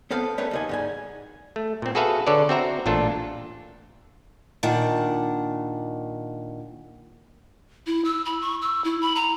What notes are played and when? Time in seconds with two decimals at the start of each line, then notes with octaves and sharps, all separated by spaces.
0.11 B3 C4 A4 B4 F5
0.38 G3 A3 C#4 A#4 B4
0.51 D#2 D#3 G#5
0.69 G#2 G3 G#5
1.56 A3
1.82 A#2 C4
1.95 F#4 G#4 A4 B4 E5 F5
2.27 D3 A4 B4 C#5 D5
2.49 C4 F#4 E5 A#5
2.86 A1 A#2 D4 F4 A4
4.63 A#2 D#3 D4 F#5
7.87 E4
8.05 E6
8.26 B5
8.41 C#6
8.62 E6
8.84 E4
9.01 B5
9.15 A#5